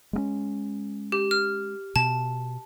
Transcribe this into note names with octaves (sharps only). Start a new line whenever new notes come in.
G#3 A#3 C#4
G4
F6
B2 A5